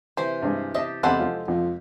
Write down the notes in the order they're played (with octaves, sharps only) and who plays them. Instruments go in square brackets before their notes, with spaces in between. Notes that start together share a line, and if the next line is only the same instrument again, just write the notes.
[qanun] C3 E3 [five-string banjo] C5
[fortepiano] G2 G#3 C4
[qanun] G4 A5 [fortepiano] C5 D#5 E5
[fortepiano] E2 C3 B5 [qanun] G#3 G4 [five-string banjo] A4 C5 F#5
[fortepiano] F3 F4
[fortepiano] F2 [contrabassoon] F3